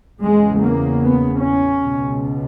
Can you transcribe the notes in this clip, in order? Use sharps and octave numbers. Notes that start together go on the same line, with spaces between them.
E2 C#3 G#3
A#3
B3
C#4
C#2 B2